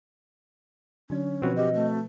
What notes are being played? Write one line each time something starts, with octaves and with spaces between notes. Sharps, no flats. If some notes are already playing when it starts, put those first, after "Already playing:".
D3 F#3 C#4 D4
B2 F3 C4 F#4 B4
G4 D#5
A3